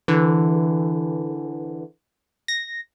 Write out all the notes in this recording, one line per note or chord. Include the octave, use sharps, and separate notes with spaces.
D3 E3
A#6